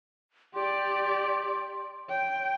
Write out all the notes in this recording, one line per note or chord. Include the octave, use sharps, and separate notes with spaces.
G4 D5 C6
C#5 G5